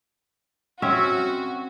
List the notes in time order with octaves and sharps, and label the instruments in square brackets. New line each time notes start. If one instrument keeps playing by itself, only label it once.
[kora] C4 C#4 E5 [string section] F#4